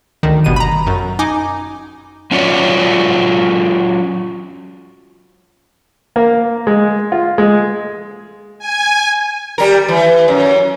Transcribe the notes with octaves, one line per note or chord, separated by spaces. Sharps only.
D2 D#3
G1 B2 D#7
A#5 B5
F#2
D#4 G#5 D6
F#3 C#4 F4 F#4 C#5 D5
A#3
G#3
F4
G#3
G#5
G3 A#4
E3
F#2